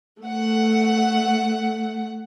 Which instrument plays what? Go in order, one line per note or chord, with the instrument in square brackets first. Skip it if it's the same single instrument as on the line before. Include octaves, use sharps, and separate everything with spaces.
[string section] A3 F#5